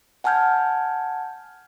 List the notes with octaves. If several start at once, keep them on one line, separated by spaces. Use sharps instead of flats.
F#5 G#5 A5 F6 G6 G#6